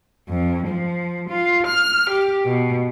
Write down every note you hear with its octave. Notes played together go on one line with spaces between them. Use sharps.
F2
F3
F4
F6
G4
B2